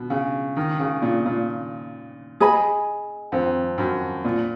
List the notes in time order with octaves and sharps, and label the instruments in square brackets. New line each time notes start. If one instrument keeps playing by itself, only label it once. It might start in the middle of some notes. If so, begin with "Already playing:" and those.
Already playing: [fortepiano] B2
C#3
D#3
C#3
A#2
A#2
[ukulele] G#4 D#5 G#5 B5
[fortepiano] F2
F#2
A#2